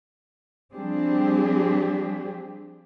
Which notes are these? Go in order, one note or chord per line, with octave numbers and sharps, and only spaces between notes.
F3 G3 C4 D4 G4 G#4